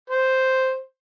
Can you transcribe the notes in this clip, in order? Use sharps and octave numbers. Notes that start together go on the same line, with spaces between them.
C5